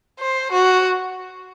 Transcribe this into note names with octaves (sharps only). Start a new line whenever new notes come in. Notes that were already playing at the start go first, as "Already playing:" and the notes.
C5
F#4